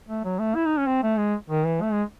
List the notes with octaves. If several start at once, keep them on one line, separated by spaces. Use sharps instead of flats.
A3
F#3
A3
E4
D#4
C#4
C4
A3
G#3
D#3
E3
A3
G#3